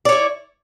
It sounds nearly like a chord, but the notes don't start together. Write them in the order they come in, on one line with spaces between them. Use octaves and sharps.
D5 C#5 E4